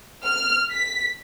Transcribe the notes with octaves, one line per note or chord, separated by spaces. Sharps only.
F6
B6